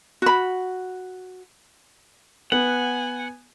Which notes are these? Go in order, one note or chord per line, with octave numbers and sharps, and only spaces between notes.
F#4 B5
B3 F#5 G#5